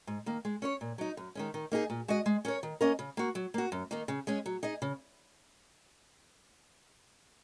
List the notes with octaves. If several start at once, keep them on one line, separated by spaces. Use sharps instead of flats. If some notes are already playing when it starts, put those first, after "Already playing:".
G#2
D#3 A#3
G#3
C#4 A#4 C#5
A#2
F#3 D#4
F#2
D#3 G#3 C#4
D#3
A#3 D#4 G#4
A#2
G#3 F#4 D#5
G#3
C#4 A#4 C#5
D#3
A#3 C#4 A#4 D#5
C#3
A#3 F#4
F#3
A#3 F#4
F#2
D#3 A#3 D#4
C#3
G#3 C#4 G#4
F#3
D#4 G#4 D#5
C#3